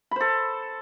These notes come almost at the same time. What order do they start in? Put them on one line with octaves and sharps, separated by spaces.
B5 C5 A4